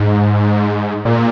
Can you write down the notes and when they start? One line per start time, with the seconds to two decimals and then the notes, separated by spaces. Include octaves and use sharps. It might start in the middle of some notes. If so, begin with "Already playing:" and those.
Already playing: G#2
1.05 A#2